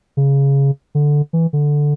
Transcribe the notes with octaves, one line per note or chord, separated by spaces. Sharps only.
C#3
D3
E3
D3